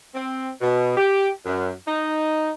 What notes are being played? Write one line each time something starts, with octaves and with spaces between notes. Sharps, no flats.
C4
B2
G4
F#2
D#4